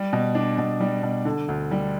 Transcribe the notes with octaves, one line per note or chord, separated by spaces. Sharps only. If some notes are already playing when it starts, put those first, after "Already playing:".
Already playing: G3
B2
D4
B2
G3
B2
D3
D2
G3